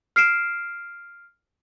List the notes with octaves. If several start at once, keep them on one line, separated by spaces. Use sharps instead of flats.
F6 C7 D7 E7